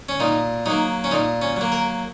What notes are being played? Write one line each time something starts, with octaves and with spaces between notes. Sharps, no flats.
C#4
A#2 D#4
F#3 A#3 D#4
C#4
A#2 D#4
C#4
F#3 A#3
A#4